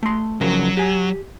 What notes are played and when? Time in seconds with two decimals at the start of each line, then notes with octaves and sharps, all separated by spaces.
0.03 A3 C6
0.41 C#3 F3 F#3 A#4
0.77 G4 G#5